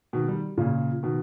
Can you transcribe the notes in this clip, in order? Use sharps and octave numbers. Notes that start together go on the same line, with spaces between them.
B2 D#3
D#3 G3
A#2 C#3
B2 D#3